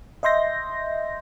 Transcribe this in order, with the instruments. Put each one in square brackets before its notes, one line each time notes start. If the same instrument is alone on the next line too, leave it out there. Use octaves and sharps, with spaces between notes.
[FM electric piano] D#5 E5 C6 G6 A#6